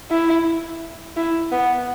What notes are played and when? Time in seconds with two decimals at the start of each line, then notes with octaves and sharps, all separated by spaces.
0.11 E4
1.16 E4
1.52 B3